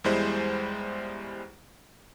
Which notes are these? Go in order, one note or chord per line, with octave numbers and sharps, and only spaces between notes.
E2 G3 G#3 E4 C5